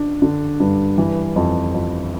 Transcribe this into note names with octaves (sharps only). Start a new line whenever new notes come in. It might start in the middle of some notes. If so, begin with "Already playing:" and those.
Already playing: D4
D3
G2
E3
F2
F2